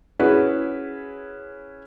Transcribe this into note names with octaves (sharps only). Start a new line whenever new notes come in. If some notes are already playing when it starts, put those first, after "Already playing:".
C#4 E4 F#4 G#4 B4